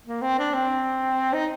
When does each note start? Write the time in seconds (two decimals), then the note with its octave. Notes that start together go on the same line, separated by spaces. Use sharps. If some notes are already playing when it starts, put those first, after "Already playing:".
0.07 A#3
0.22 C4
0.39 D4
0.54 C4
1.33 D#4